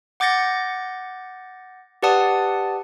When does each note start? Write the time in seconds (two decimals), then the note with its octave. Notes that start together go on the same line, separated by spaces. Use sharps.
0.20 F#5 D6 G6 A6 A#6 C#7
2.03 G4 B4 D5 F#5 A5 D#6